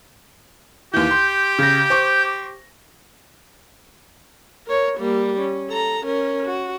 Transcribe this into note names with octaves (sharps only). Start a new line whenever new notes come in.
D#2 E3 G4 G6
C6
C#3 A#6
C5 C#6 D6
A#4 C#5
G3 A#3
C#4
A4 A#5
C#4 A#4
F#4